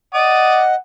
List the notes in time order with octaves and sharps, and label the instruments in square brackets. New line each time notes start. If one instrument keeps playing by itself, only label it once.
[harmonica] D5 D#6 [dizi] D#5 [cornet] F#5